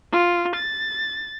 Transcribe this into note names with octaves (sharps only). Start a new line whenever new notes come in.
F4
A6